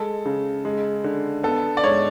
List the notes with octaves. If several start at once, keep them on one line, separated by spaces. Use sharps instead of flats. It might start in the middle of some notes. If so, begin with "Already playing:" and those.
Already playing: G#3 A4
C#3
G#3
D3
B3 A4
D5
G#2 C#5